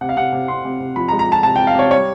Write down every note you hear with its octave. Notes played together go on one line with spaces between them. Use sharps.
C3 F#5
F5
C3 F#5
C3
C3 C6
C3
C3
F3 B5
A#5
G#3
A#5
F3 A5
C3 A5
G5
C3
F5
C3 C#5
G3 C#5